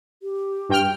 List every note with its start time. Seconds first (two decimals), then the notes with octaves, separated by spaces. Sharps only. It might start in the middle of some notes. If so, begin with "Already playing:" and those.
0.23 G4
0.69 G2 G5 F6